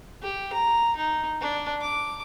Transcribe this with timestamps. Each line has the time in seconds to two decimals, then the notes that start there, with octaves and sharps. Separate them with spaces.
0.23 G4
0.53 A#5
0.96 D#4
1.41 D4
1.81 D6